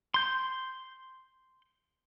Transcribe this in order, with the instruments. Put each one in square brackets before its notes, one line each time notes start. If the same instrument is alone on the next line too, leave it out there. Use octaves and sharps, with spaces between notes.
[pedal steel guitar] C6 G6